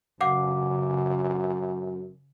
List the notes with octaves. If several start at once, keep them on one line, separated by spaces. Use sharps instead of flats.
F#2 C#3 F5 F#5 D6